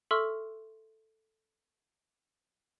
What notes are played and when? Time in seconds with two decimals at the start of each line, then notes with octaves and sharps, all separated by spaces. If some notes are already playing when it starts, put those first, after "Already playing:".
0.11 A4 E5 C6 C#6 E6 F6